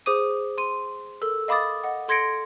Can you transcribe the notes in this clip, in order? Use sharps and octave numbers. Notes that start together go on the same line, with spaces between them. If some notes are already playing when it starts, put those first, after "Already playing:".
G#4 C5 D6 D#6 D#7
C6 D#7
A4 A#4 E6
D#5 F5 B5 D6 D#6 A6
D#5 F#5
A4 C6 G#6 A#6 C#7 D7